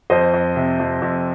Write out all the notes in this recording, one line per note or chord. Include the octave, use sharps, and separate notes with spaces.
F2 C5 D#5
F2
C3
F2
F2